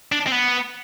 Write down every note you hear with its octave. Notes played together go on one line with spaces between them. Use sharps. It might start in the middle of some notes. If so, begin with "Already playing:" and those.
D4
C4
B3